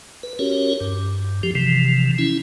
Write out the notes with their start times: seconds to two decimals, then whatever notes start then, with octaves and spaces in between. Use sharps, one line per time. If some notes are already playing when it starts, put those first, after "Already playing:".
0.23 B4
0.39 C#4 F#4 G4 A#4 C#5
0.81 G2
1.43 F3 G4
1.55 C3 E3 F3
2.18 C#4 E4